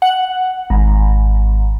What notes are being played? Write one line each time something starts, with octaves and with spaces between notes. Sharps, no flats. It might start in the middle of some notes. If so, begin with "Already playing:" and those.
F#5
G#1